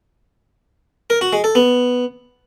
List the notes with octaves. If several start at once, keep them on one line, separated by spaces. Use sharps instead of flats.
A#4
F#4
G#3
A4
B3